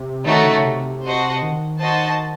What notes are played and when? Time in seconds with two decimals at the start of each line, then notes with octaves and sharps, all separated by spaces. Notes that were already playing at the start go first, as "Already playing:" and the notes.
Already playing: C3
0.25 D#3 A3 D#4 F#4 C#5
0.44 C#3
0.58 C#3
0.65 C3
1.04 F#4 C5 D#5 F#5 A5
1.42 D#3
1.81 F#4 C5 D#5 A5